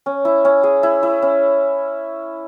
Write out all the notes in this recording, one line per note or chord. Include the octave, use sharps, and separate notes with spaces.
C#4
E4
C#4
G#4
E4
E4
C#4